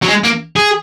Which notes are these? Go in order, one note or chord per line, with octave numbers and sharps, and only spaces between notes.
F#3
G#3
A#3
G#4